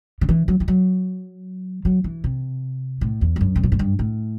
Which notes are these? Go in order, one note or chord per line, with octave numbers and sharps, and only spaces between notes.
D3
E3
F#3
E3
F#3
F#3
E3
C3
A2
E2
G2
F#2
C3
B2
A2
G2
A2